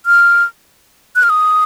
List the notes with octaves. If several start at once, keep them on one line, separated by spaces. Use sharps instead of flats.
F6
F#6
F6
D#6